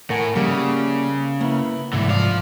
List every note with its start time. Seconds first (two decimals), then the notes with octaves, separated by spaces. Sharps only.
0.10 A2 A#4 F#5 G#5
0.35 C#3 G3 A#3 E5
1.40 A#3 B3 E4
1.93 C2 G#2 D3 E3
2.10 F3 D5 F5